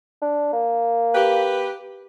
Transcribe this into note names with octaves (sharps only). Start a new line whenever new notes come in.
D4
A#3
G4 B4